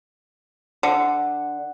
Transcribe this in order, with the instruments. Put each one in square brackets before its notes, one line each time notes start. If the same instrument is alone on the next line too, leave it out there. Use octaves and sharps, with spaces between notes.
[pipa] D3 [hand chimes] F#5